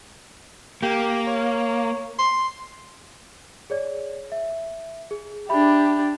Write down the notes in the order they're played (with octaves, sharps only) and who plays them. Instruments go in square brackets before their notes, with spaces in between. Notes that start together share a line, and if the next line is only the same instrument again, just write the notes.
[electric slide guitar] A#3 [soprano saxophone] G4
[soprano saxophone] C#5
C6
[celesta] G#4 C#5 D5
E5
G#4
[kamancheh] D4 G4 [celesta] E5 B5